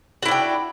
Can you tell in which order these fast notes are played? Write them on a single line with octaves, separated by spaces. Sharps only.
F#4 E4 D4 G5